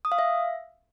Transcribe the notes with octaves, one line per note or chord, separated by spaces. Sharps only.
D#6
F5
E5